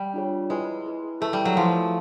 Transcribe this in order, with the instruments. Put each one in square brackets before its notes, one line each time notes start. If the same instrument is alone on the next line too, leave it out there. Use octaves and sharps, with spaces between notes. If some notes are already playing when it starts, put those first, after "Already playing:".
Already playing: [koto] G3
[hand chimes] D4 F4 G#4 C#5
[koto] G#3 [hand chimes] E4 G#4 B4
[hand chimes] E4 G#4 B4
[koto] A3 [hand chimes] E4 G#4 B4
[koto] G3
F#3
[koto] F3 [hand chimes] E4 G#4 B4